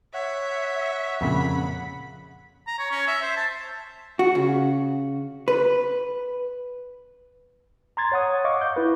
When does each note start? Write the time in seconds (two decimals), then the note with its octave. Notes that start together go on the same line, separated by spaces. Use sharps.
0.14 C#5 E5 F#5
1.21 F2 A#2 C#3 B5
2.67 A#5
2.79 C#5
2.91 C#4
3.07 E5
3.22 C5
3.37 A5
4.19 F#4
4.35 C#3
5.48 B4
7.97 A#5 C6 G#6 A6
8.12 C#5 F#5 D#6
8.45 D#5 F5 C#6 D6
8.61 G6
8.76 E4 B4